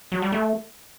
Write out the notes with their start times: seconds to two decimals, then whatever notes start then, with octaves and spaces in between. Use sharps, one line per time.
0.12 F#3
0.22 G3
0.32 A3